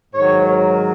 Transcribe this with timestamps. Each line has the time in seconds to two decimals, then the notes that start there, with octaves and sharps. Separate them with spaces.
0.14 G#2 D#3 F#3 C#5
0.50 A#4